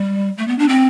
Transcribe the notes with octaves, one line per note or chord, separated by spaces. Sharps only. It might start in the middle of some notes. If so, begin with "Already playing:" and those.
Already playing: G3
A3
B3
D4
C4